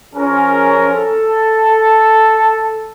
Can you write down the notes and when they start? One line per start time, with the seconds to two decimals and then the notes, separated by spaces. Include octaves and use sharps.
0.14 F3 C#4 G#4 A#4
0.93 A4